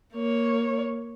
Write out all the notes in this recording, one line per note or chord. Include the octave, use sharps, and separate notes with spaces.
A#3 C#5